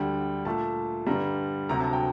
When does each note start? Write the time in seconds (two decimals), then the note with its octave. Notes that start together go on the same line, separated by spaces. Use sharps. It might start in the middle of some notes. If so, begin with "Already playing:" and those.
Already playing: D2 D3 G3 G5
0.45 A#2 A3 A5
1.07 G2 D3 G3 A#5
1.69 D2 C3 F#3 A#5
1.80 A5
1.93 G5